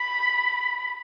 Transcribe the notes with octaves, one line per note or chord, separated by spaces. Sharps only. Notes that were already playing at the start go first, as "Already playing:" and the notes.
Already playing: B5